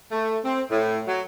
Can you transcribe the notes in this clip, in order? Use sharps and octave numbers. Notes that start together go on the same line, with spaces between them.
A3
C4
A2
F#3